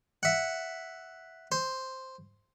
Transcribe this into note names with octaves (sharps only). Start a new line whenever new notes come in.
E5 F#5
C5